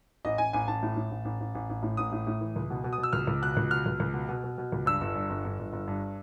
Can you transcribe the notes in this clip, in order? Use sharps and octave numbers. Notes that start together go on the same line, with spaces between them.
A1 D#5
A1 G#5
A1 G#5
A1 A5
A2
A2
A1
A1
A1
A1
A1
A2
A1 D#6
A2
A2
E3
C#2
B2
B2
D#6
B2
E6
C#2 F6
C#2
B2 F#6
C#2
B2 F6
C#2
C#2
B2
B2
B2
B2
C#2
G2 E6
G1
G2
G1
G1
G1
G1
G2